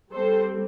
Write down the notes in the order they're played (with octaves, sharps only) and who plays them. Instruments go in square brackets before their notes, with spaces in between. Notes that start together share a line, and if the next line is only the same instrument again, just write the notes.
[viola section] G3 C4 A4 C5